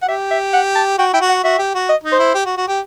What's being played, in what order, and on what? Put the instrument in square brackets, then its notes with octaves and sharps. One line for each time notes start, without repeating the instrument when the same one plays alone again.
[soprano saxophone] F#5
[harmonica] G4 [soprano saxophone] E5
[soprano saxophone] E5
F#5
A5
[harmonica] F#4 [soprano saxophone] G5
[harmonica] E4 [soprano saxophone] G5
[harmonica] F#4
[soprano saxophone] F#5
[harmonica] F#4 [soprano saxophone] E5
[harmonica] G4
F#4
[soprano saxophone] D#5
[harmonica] D#4
[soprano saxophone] C5
[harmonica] E4
G4
F#4
F#4
G4